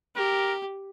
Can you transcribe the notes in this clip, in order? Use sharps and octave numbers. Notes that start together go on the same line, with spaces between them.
G4 A#4